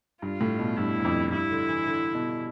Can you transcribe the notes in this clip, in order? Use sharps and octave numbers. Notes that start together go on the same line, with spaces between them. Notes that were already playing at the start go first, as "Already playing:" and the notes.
G2 F4
A2
B2
G2 E4
G2
F2
G2 E4
D3
E3
D3
B2